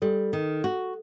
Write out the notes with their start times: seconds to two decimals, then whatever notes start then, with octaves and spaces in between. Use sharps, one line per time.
0.02 G3 A4
0.33 D#3
0.64 F#4